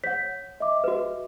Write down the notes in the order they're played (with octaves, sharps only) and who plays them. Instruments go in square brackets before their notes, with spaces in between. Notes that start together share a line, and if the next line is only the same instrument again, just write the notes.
[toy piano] C#5 F#5 [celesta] B6
[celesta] D#5 E5 D6
[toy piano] F#4 B4